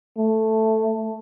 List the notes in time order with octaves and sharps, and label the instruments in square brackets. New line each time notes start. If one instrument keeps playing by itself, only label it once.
[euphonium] A3